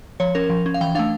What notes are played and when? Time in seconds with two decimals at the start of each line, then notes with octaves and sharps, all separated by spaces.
0.20 F3 C#5
0.35 C#4 A#4
0.50 F3
0.66 C#4
0.74 F5
0.81 E3 G5
0.95 A3 D4 F5